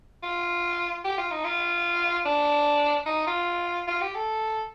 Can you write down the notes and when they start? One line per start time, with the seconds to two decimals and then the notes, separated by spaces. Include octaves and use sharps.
0.23 F4
1.04 G4
1.18 F4
1.31 D#4
1.44 F4
2.25 D4
3.06 D#4
3.27 F4
3.88 F4
4.01 G4
4.15 A4